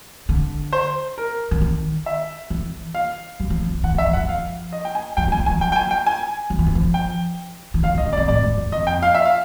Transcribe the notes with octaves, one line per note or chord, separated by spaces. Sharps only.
D3
C5
A#4
D3
D#3
E5
E3
F5
F#3
F3
F#3
F3
E3 F#5
F3
E5
F3
F#5
F#3
F3 F5
D#5
G5
G#5
F3 G5
F#3
G#5
F3
G#5
F3
F#3 G5
G5
G#5
G5
G#5
F#3
F3
E3
F3
G5
E3
D#3 F5
D3
D#5
C#3
D5
C3
G#2 D5
G#2
F#2
F2 D#5
G5
F5
E5
F5